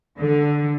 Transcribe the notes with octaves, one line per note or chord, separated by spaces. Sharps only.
D3